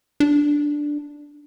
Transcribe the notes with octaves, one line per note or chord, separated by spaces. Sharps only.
D4